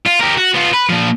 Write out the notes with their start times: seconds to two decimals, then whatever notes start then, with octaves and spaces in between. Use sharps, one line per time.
0.07 F4
0.20 G4 A#4
0.38 F#4
0.55 B3 F4
0.74 B4
0.90 A#2 F3